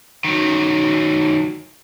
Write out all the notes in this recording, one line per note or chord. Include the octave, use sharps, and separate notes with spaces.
D#3 F#3